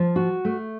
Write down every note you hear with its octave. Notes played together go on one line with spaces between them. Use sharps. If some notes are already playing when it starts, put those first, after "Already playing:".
Already playing: F3
F#4
A3